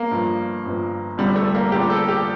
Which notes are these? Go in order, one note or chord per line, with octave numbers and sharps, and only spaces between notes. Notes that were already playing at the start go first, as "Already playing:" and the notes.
Already playing: A#3
G1 G2 F3
G1 G2 F3
F1 F2 D3 F3 G3
A3
A#3
F1 F2 D3 F3 G4
A4
G4